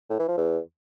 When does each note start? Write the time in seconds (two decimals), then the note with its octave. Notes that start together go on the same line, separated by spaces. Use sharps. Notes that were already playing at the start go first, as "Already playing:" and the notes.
0.10 A2
0.19 E3
0.28 F3
0.37 E2